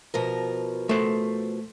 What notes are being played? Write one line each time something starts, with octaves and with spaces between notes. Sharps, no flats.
B2 F3 A#4
A3 C5